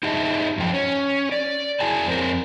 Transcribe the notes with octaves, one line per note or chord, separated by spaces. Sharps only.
D#4 G4 G#4 D#5 E5 A5
F#2 F3 G5
C#4
D5
E4 G#4 G#5 A5
F2 C4 D4 A#4